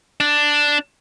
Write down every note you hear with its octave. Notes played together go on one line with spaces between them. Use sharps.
D4